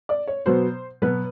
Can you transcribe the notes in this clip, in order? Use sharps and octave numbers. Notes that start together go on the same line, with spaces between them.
D5
C#5
B2 F#3 B3 C5
B2 F#3 B3 B4